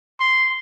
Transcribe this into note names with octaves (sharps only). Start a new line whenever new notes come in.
C6